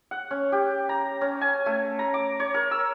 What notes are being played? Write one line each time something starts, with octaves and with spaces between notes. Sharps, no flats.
F#5
C#4
G4
A#5
C#4
G#5
A3
A#5
D6
C#5
A#4
E6